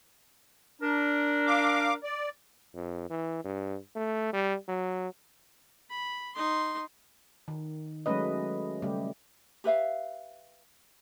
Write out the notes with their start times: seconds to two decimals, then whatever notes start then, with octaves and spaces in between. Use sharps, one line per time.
0.82 D4 A#4
1.47 F5 D6
2.04 D5
2.75 F2
3.10 E3
3.44 G2
3.96 A3
4.33 G3
4.68 F#3
5.90 B5
6.35 D#4 C6
7.48 D#3
8.06 F#3 G#3 A3 C#4 B4 D#5
8.82 C#3 G3 A3 G4
9.64 G4 B4 E5 F5